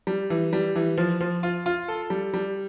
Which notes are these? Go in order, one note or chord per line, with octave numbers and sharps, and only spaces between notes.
G3
E3
G3
E3
F3
F3
F4
F4
A4
G3
G3